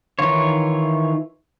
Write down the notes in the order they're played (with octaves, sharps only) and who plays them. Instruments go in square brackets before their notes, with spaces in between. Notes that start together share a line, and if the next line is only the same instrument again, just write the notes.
[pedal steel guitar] D#3 E3 F4 C#5